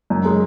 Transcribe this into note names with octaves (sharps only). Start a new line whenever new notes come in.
F#2
G#3